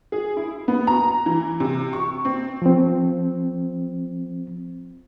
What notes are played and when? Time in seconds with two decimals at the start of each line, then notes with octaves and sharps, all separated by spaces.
0.12 G#4
0.37 E4
0.68 B3
0.87 A#5
1.26 E3
1.60 C3
1.93 C#6
2.25 C4
2.62 F3 C4